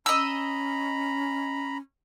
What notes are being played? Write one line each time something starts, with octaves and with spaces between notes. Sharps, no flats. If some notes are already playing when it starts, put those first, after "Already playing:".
C#4 D#5 A#5 B5 E6